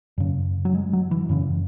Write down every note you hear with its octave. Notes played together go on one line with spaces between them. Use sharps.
F#2 C#3
F#3
G#3
F#3
E3
F#2 C#3 E3